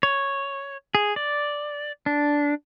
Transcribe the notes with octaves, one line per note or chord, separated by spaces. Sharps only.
C#5
G#4
D5
D4